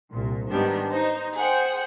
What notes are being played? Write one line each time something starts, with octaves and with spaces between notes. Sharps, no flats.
C2 A#2
G#2 D#3 G3 B3 D4
D#4 C5
G#4 C5 F#5 G5